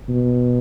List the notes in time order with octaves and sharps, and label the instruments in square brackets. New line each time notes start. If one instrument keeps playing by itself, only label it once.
[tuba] B2